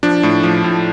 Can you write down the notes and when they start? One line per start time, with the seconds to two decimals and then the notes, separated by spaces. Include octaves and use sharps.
0.03 F3 D4
0.23 A2
0.43 F3
0.64 A2